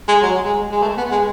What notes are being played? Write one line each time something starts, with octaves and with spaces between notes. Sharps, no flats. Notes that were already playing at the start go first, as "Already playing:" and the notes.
G#3
F#3
G#3
G#3
A3
B3
G#3